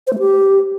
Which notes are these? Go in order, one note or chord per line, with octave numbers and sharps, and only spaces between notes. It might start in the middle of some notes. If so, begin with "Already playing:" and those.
C5
A3
G4